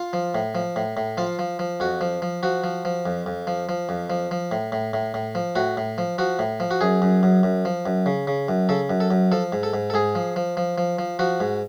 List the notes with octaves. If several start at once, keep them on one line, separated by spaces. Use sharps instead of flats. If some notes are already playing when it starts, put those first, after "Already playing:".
Already playing: F4
F3
A2
F3
A2
A2
F3 F4
F3
F3
F2 F#4
F3
F3
F3 F#4
F3
F3
F2
F2
F3
F3
F2
F3
F3
A2
A2
A2
A2
F3
A2 F#4
A2
F3
F3 F#4
A2
F3
F#4
F#2 G#4
F#2
F#2
F#2
F3
F#2
C#3
C#3
F#2
C#3 A4
F#2
A4
F#2
F3 A4
G#2
A4
G#2
A4
G#2 G#4
F3
F3
F3
F3
F3
F3 F#4
G#2